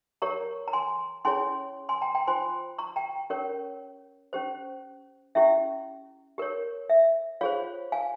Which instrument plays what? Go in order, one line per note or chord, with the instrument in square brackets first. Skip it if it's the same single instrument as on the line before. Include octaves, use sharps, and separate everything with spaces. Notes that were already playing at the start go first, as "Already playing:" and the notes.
[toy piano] G4 A#4 C#5 A#5 C#6
A#5
G#5 C6
C#4 E4 G#4 C#5 G#5 C6
G#5 C6
G5 A#5
G5 A#5
F4 C5 G#5 C6
A#5 C#6
G5 A#5
C#4 G4 A#4 C#5
C#4 G4 C5
C#4 E4 G4 E5
G4 A#4 C#5
E5
F4 G#4 C5 C#5 F5
F5 G#5